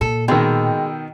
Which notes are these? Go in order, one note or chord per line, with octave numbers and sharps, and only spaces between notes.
A#2 A4
B2 D#3 G#3 G5 E6